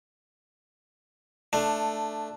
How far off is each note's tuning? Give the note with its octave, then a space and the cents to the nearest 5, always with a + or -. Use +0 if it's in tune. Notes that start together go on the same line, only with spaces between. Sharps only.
A3 +0 D4 +10